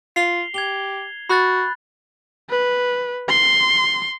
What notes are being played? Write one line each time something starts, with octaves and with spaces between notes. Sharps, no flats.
F4 C7 F7 G7
G4 G#6 F7 G7
F#4 B5 F#6 A6
B4
C6